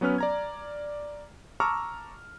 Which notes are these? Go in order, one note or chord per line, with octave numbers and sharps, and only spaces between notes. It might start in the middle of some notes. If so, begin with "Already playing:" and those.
F#3 B3 C#4 B4 F6
D5 A#5 G#6
A5 A#5 C#6 D6 E6 F6